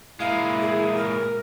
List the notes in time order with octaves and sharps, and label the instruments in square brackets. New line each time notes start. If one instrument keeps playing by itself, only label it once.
[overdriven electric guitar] A#2 G#3 [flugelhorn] E4 [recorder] F5
[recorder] G#4
A#4